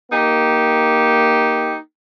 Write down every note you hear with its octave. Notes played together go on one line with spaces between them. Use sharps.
A#3 D#4 G4